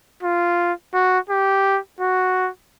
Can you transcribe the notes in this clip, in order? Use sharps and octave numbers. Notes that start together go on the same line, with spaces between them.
F4
F#4
G4
F#4